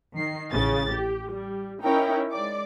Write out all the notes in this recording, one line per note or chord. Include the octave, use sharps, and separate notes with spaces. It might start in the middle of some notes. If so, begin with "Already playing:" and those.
D#3 C7
A1 C#3 A6
G4
G3
C#4 D#4 E4 A#4 C#5 G5
G#3 D5 D6